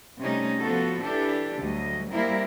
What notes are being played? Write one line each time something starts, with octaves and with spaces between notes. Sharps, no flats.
C3 G3 A3 C#4 D#4
F3 B3 F#4 A4
E3 D4 G4 A4
D2 F#3 G3 D#5
G3 A#3 C4 E4 A#4